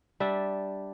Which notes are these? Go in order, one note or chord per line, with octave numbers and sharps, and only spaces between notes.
G3 D4 E5